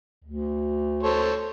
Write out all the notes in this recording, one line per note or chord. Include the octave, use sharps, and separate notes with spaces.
D2
A4 C5 C#5